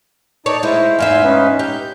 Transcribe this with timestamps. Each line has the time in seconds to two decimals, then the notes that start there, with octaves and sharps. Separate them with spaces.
0.46 D#4 C#5 D5 A5
0.63 G#3 E4 C5
0.99 E2 G#2 E5 F5 G#5 C6
1.24 C#4 D#4 B4
1.59 G4 G6